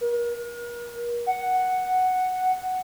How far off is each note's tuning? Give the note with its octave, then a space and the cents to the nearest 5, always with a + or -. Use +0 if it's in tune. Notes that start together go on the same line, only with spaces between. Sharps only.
A#4 +40
F#5 +0